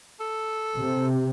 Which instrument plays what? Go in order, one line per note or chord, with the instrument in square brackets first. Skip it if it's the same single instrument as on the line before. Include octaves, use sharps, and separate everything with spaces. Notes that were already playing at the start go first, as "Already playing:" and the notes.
[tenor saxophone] A4
[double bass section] C3